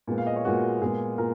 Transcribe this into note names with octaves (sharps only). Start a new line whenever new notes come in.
A#2 G#3 B3
F5
D#5
C#5
A#2 G#3 B3 F#4
A#2 G#3 B3 G#4
A#2 A#4